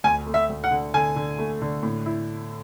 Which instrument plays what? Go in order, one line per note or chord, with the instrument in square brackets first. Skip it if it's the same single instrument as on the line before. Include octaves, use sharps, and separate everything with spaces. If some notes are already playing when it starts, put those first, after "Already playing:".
[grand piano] D2 [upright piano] G#5
[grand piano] A3
[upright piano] E5
[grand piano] D2
[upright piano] F#5
[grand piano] D3
[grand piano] D3 [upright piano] G#5
[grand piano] D3
A3
D3
A2
E4